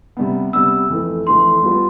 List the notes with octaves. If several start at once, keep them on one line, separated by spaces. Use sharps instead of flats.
C3 G3 B3
C3 G3 B3 E6
F2 E3 A3 E4 B4
F2 E3 A3 E4 B4 C6
G3 B3 F4 B4